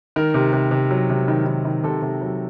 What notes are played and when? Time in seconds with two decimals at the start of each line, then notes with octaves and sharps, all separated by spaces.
0.16 D#3 A#4
0.34 C3
0.53 C3
0.71 C3
0.91 F#3
1.10 C3
1.28 D#3
1.46 D#3
1.65 D#3
1.84 C3 A4
2.02 C3
2.21 F#3